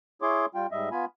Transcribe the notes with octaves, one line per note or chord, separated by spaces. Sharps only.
E4 G#4 C#5 C6 D6
G3 F4 G5
G#2 G3 D#5 E5
B3 F4 G#5 B5